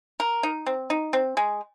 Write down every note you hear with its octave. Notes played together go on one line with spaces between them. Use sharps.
A#4
D#4
C4
D#4
C4
G#3